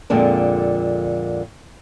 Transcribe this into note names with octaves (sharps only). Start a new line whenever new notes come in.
F2 A#2 D3 G#3 D4